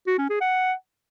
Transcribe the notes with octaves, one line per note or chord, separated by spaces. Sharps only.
F#4
C#4
G#4
F#5